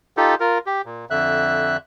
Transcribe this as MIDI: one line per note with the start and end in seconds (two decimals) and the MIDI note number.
0.17 0.35 63
0.17 0.35 65
0.17 0.35 67
0.17 0.35 69
0.40 0.58 65
0.40 0.58 70
0.66 0.82 67
0.85 1.05 46
1.10 1.77 41
1.10 1.77 50
1.10 1.77 76
1.10 1.77 90